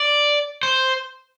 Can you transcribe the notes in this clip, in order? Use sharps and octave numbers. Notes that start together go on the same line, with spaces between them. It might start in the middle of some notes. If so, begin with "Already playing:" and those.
Already playing: D5
C5